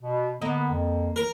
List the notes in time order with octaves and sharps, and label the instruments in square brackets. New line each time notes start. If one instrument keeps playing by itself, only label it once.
[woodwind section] B2
[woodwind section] D3 B3 [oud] A#3 D#5
[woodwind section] F2
[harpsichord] A#4